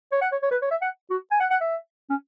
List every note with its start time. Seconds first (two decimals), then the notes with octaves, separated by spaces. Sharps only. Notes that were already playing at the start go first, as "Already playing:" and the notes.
0.12 C#5
0.22 F#5
0.32 C#5
0.42 C#5
0.51 B4
0.62 C#5
0.71 E5
0.82 F#5
1.10 F#4
1.31 G#5
1.40 F#5
1.50 F#5
1.61 E5
2.10 C#4